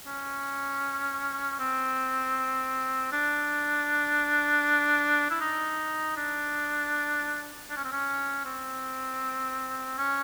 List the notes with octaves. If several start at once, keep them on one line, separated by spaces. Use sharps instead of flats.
C#4
C4
D4
E4
D#4
D4
D4
C#4
C4
C#4
C4
C#4